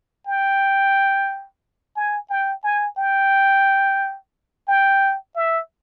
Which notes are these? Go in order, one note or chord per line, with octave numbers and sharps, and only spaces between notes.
G5
G#5
G5
G#5
G5
G5
E5